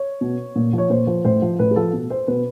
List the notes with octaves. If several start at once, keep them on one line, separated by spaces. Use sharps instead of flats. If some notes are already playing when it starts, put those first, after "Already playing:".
Already playing: C#5
B2
A#2
F3
C#5
A#2 C5
F3 C5
A2 C5
F3
A2 B4
G#4
F3 A4
B2
C5
B2 B4